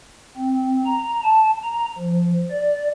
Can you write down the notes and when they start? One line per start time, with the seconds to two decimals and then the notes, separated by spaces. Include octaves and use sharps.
0.37 C4
0.86 A#5
1.24 A5
1.64 A#5
1.99 F3
2.50 D5